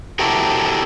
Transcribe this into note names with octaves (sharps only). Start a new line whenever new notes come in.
E4 F#4 G4 A4 A#4